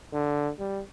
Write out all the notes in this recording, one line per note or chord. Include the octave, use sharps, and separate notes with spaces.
D3
G3